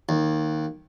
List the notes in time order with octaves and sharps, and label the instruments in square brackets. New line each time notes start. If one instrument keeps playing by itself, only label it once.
[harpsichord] D#2